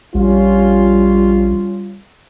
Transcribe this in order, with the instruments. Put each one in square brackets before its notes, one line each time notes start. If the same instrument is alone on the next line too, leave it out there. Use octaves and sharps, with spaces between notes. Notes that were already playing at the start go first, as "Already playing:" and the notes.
[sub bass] A#1 [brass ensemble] G3 C#4 F4